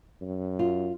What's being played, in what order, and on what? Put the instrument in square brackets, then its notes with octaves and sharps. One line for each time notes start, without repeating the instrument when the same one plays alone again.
[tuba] F#2
[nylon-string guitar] F4